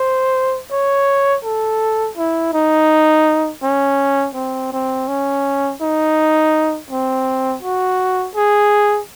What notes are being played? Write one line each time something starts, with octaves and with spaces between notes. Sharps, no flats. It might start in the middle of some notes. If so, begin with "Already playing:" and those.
Already playing: C5
C#5
A4
E4
D#4
C#4
C4
C4
C#4
D#4
C4
F#4
G#4